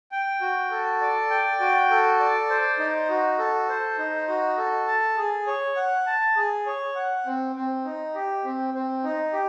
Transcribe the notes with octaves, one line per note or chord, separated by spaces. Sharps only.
G5
F#4
A4
D5
G5
F#4
A4
D5
C5
D#4
F#4
A4
C5
D#4
F#4
A4
A5
G#4
C#5
F#5
A5
G#4
C#5
F#5
C4
C4
D#4
G4
C4
C4
D#4
G4